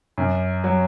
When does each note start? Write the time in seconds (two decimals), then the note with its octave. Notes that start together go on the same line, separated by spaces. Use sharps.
0.18 F#2
0.64 F#3